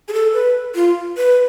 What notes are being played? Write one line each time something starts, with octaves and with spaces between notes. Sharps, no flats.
G#4
A4
B4
F4
B4